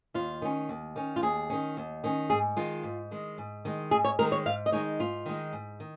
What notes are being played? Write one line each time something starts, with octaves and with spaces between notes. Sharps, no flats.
D#2 F4
D#3 C#4
D#2
D#3 C#4
F4
D#2 G#4
D#3 C#4
D#2
D#3 C#4
G#2 G#4
D#3 G#3 F4
G#2
D#3 G#3
G#2
D#3 G#3
G#2 G#4
C#5
D#3 G#3 A#4
C#5
G#2 F5
D#5
D#3 G#3 D#4 C#5
G#2 F4
D#3 G#3 D#4
G#2
D#3